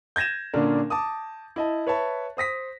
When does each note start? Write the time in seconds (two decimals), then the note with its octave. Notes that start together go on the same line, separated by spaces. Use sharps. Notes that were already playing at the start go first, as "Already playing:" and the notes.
0.16 G6 G#6 A#6 D#7 E7
0.53 A#2 D3 C#4 D4 A#4
0.90 A5 D6 D#6
1.56 E4 D#5 A5
1.87 B4 C#5 E5 A5 B5
2.37 C5 D#6 A#6 B6